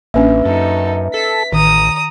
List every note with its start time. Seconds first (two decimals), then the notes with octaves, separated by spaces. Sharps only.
0.14 A1 A#3 C#4 D4 B4 E5
0.45 F#2 D#4 A4
1.14 A4 B6
1.52 A1 D#3 A#5 D#6